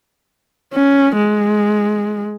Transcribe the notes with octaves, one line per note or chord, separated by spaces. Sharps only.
C#4
G#3